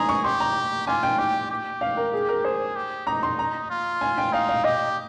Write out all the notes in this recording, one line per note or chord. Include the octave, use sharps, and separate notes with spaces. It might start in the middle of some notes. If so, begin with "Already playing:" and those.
Already playing: G#4 A#5 C6
C#6
G4 C6
A#5
F4 G#5
G5
G4 G5
G4
F5
A#4
G#4
A#4
G#4 C5
G4
D#4 A#5
C6
A#5
F4
G#5
G5
D#4 F5
F5
G4 D#5